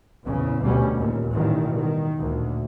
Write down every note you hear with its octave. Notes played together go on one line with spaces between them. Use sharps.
A#1 E2 C#3
D2 B2 G3 C#4
D#2 A#2
A1 E2 B2 D#3 G3
D#3
D2 A#2